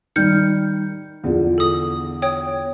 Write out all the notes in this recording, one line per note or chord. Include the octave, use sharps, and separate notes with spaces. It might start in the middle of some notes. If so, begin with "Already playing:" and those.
D#3 G3 F6 G6 C#7
E2 D3 F3
A4 D#6
C#5 G5 D#6